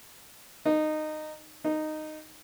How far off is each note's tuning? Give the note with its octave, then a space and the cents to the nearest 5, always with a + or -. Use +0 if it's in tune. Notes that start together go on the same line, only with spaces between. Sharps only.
D#4 -15
D#4 -10